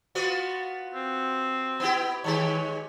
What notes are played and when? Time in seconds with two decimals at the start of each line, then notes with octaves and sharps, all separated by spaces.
0.15 B3 F4 F#4
0.95 C4
1.80 B3 E4 G4
2.24 D#3 G#3 G4 C#5